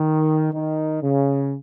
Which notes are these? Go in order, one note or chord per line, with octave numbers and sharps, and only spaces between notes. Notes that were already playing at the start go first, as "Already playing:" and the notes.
Already playing: D#3
D#3
C#3